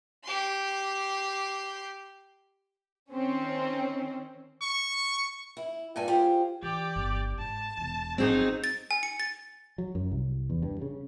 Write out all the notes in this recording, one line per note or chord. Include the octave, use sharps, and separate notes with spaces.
G4 C6
D#3 C4 C#4
C#6
E4
G2 A#2 A4 G#5
F4 G4 G#4 C5
E3 G4 D5
G1 D#3
G#1 A5
E1 E2
G1 F3 F#3 C4 D#4 G#4
A6
G#5
C#7
A6
F#3
F#2
C2
E2
G2
C#3